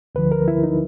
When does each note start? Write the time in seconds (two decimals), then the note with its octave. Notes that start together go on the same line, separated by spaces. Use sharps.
0.15 D2 D3 F3 B4
0.32 A#4
0.48 E4
0.63 D#4